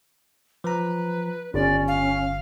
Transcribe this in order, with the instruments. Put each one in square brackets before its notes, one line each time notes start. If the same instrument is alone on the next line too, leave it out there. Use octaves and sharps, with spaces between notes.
[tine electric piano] F3 A#5 [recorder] B4
[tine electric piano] G1 [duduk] C#4 [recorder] D5
[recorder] F5